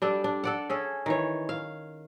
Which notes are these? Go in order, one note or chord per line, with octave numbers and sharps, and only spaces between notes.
G3 D4 A4
D4
A4 D5 F#5
C#4 G#4 A4
D#3 E3 C#5
F5